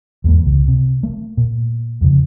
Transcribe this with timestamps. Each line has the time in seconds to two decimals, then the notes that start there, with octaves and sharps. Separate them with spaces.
0.24 E2 G#2 G3 A#3
0.45 C#2
0.68 C3
1.03 A3 A#3
1.37 A#2
2.01 F2 C#3